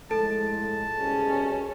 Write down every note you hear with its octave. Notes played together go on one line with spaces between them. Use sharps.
A2 F3 G#3 A4 A5
C2 B2 C#4 G#4